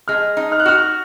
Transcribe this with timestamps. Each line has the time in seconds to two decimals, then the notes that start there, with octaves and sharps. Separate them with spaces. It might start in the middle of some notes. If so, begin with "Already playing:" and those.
0.08 G#3 F6
0.37 D#4
0.52 F6
0.60 F#6
0.65 F#4 F6